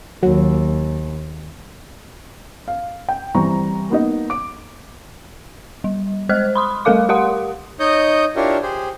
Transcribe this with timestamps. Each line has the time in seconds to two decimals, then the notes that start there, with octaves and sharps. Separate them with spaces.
0.23 D#2 F#3
2.68 F5
3.09 G5
3.35 E3 G3 C4 A#5 C#6
3.90 A#3 B3 D#4 D#5
4.30 D6 D7
5.84 G3
6.29 G#3 C5 D#5 F6 F#6
6.55 B5 C6 D#6
6.85 G3 A3 A4 A#4 F5 D6
7.09 G4 A#4 F5 F#5 C6 D#6
7.80 D#4 C#5 D#5 D#6 G6
8.36 D4 E4 F4 G4 A#4 C#5
8.62 G4 G#4 C5